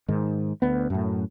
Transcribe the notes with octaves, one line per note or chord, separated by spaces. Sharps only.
G#2 D#3
D2 B3
F#2 A2